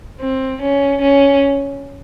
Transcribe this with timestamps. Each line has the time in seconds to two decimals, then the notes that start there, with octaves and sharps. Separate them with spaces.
0.21 C4
0.62 C#4
1.02 C#4